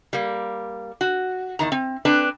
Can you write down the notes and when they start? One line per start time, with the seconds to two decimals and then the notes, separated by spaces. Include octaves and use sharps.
0.13 G3 A#3
1.01 F#4
1.59 E2 D#3 A#5
1.72 C4
2.05 C4 D4 B4